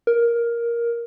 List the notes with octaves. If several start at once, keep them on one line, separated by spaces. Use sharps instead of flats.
A#4